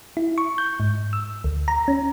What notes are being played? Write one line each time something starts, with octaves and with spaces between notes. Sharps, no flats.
E4
C#6
G6
G#2
E6
D2
A#5
C#4